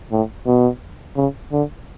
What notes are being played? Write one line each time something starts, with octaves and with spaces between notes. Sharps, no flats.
A2
B2
C#3
D3